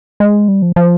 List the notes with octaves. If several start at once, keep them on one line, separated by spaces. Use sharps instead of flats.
G#3
G3
F3
F3